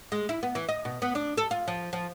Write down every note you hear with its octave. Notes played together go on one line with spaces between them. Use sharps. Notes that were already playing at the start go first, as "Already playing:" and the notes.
G#3
E4
B3
E3
D#5
B2
B3
D4
A4
F4
F3
F3